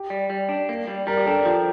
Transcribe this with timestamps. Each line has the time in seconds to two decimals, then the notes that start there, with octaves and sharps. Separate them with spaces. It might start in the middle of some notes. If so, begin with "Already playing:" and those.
Already playing: G4
0.10 G3
0.30 G3
0.49 D4
0.69 A#3
0.88 G3
1.07 G3 A#4
1.17 G4
1.26 D4 A4
1.45 F3